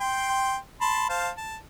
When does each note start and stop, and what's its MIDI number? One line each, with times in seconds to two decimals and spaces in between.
0.01 0.56 79
0.01 0.56 84
0.81 1.06 81
0.81 1.06 83
0.81 1.06 84
1.09 1.29 72
1.09 1.29 77
1.09 1.29 81
1.37 1.56 81